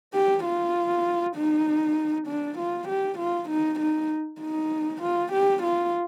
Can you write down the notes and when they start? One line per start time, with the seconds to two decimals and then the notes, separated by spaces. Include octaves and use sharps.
0.14 G4
0.44 F4
1.36 D#4
2.27 D4
2.58 F4
2.89 G4
3.19 F4
3.49 D#4
3.80 D#4
4.41 D#4
5.02 F4
5.33 G4
5.63 F4